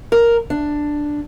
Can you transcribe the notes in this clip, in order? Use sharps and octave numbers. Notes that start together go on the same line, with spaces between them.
A#4
D4